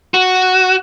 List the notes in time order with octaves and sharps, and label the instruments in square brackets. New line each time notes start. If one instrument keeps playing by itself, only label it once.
[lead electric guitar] F#4